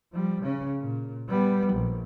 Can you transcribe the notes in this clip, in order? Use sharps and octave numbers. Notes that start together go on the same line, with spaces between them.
F3 G3
C#3 C#4
A#2
G3 B3
A#1